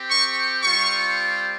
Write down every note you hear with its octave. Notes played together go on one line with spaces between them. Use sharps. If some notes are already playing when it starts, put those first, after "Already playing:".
Already playing: C4 G4
C#6
G3 C4 F4 C#6